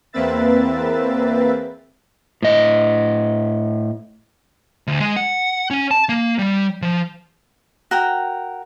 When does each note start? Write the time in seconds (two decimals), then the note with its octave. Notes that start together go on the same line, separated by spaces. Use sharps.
0.13 E2 A#3 C4 B4 E5 A6
2.42 A2 D#5
4.87 D2
5.00 G#3
5.16 F#5
5.70 C#4
5.91 A5
6.09 A#3
6.39 G3
6.82 F3
7.91 F#4 A#4 G5